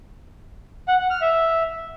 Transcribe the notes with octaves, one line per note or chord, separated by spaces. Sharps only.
F#5
F#5
F6
E5